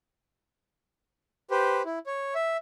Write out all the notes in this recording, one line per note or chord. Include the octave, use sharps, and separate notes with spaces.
G4 B4 C5
E4
C#5
E5